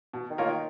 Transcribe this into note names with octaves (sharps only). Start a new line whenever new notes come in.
B2
D#3
A#3 F4 A#4 C#5
D#3